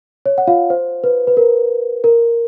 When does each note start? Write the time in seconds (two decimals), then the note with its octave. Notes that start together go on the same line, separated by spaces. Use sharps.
0.26 C#5
0.38 F#5
0.47 F4 F5
0.70 C5
1.04 B4
1.27 B4
1.37 A#4
2.04 A#4